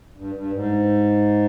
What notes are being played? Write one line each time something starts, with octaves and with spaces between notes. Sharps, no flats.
G2
G2
G#2